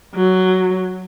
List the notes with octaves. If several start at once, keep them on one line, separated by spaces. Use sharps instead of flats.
F#3